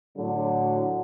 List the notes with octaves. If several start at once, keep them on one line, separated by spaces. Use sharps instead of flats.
A2 D3 F#3